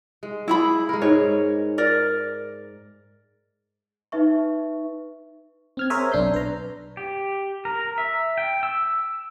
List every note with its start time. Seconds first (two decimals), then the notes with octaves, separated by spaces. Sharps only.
0.23 G#3
0.48 E4 G#4 B5
0.89 G#3 A#4
1.02 G#2 C#5
1.78 A#4 D5
4.12 D#4 B4 E5 C#6
5.77 C4 F6 G#6
5.90 G#4 A#4 C5 C#5 E5 G#5
6.12 B1 D4 C6 G6
6.34 B4 A#5
6.97 G4
7.65 A#4
7.98 E5
8.38 G5
8.63 E6